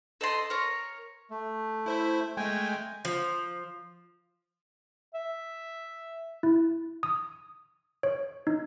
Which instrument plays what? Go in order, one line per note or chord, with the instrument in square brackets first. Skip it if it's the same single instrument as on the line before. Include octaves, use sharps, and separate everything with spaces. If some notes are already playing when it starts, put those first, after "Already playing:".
[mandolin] A4 D#5 C6
A#4 C#5
[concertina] A3
[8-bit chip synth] E4 C5 E5
[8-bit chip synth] G#3 A3 [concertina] G5 G#5
[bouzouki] F3
[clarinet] E5
[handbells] E4
D#6
C#5
D#4